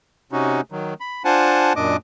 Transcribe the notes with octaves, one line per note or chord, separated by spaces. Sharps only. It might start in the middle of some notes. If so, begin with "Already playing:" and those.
C3 C#4 D#4 F#4
D#3 F#3
B5
D4 F4 C5 F#5 G#5 A5
F#2 A#2 D4 D#5 D6